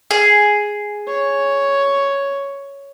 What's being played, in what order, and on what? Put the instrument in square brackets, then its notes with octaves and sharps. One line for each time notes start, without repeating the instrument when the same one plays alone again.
[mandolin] G#4
[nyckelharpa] C#5